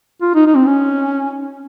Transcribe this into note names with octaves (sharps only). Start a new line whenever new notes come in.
F4
D#4
D#4
C4
C#4